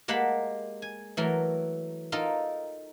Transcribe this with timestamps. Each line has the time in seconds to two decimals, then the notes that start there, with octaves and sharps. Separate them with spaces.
0.08 G#3 A#3 G4 F#5 A5 B5
0.82 G#5
1.17 E3 F#3 A3 A#4
2.12 D#4 F4 A4 A#4